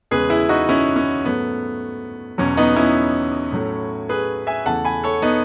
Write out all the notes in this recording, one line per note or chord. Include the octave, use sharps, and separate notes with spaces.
E2 C#3 G#3 G#4 B4
E4 G#4
D#4 F#4
C#4 E4
C#4
G#2 F#3 A3 B3
E2 B2 F#3 C#4
B3 D#4
C#4 E4
A2 F#3 A3
G#4 B4
E5 G#5
E2 C#3 E3 A3 F#5 A5
G#5 B5
A4 C#5
B3 D#4